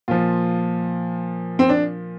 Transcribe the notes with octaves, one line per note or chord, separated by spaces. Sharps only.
A#2 F3 F4
C4
D4